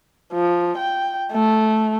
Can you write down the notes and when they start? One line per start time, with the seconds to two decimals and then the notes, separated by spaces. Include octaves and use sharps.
0.33 F3
0.78 G5
1.33 A3